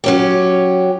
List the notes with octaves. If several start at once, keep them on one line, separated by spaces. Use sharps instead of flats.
F#3 C#4 G4